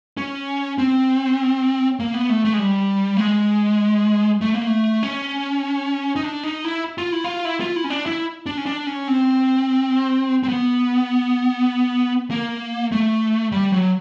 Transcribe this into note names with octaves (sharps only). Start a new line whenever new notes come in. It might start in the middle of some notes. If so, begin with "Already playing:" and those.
C#4
C4
A#3
B3
A3
A3
G#3
G3
A3
G#3
A3
A#3
A3
C#4
D#4
D4
D#4
E4
F4
E4
F4
E4
F4
E4
C#4
D4
E4
D4
C#4
D4
C#4
C4
C4
B3
A#3
A3
G3
F#3